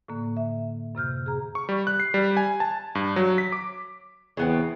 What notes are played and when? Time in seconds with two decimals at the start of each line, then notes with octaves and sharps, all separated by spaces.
0.08 A2 D3 A#3
0.37 E5
0.95 F#2 C3 F6 G6
1.26 G#4 A#5
1.55 C#6
1.69 G3
1.87 F#6
2.00 C7
2.14 G3
2.37 G#5
2.60 A5
2.95 G2
3.16 F#3
3.38 B6
3.52 D6
4.37 E2 C#3 B3 C4